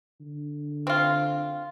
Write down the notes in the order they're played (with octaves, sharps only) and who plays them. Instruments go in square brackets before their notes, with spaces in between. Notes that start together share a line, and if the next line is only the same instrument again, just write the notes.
[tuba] D3
[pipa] C4 F4